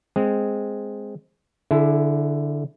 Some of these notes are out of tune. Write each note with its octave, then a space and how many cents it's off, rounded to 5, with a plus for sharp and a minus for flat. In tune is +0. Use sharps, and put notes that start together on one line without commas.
G#3 +0 C4 +0
D3 +0 E4 +0 G#4 +40